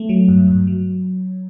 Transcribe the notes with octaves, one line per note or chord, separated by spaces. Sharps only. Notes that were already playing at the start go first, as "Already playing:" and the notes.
Already playing: A3
F#3
G2
G2
F#3